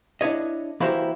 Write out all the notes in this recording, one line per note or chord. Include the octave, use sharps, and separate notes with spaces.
D4 E4 C#5 D#5
E3 A#3 E4 F#4 G4 C5